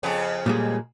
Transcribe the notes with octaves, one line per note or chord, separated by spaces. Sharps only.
F2 C#3 B3
A#2 G3 G#3